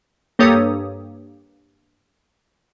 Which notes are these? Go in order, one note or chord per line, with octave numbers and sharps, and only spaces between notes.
G2 A#3 G4 A4 C#5 D#6